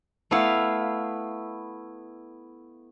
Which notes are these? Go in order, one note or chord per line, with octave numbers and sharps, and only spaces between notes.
A3 B3 E4 F5